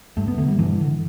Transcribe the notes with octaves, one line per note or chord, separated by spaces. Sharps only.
G2 A3
B3
D3 A3
G3
G2 E3
D3